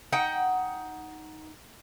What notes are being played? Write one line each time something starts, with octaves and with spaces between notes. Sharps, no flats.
D#4 F#5 G5